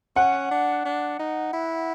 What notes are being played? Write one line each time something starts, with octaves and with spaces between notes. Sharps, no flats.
C#4 F#5
D4
D4
D#4
E4